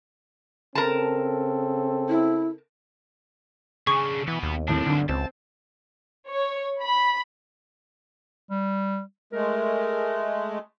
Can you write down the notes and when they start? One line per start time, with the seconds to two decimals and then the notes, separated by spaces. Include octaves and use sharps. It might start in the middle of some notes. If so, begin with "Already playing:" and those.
0.75 C#3 C4 A4 A#4 A5
2.09 E4
3.87 C#3 D4 G#4 C#6
4.28 B2 E3 B3
4.43 D#2
4.68 B1 F2 A2 D4 A5
4.86 D2 G2 D3
5.09 C#2 C4 A5
6.27 C#5
6.81 B5
8.51 G3
9.33 G#3 A3 A#4